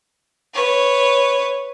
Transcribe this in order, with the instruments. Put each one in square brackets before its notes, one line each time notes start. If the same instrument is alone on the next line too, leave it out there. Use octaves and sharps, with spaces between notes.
[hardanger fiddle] B4 C#5